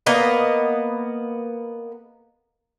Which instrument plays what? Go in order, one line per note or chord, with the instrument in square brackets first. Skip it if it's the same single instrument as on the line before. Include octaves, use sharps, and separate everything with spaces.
[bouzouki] A#3 B3 D#5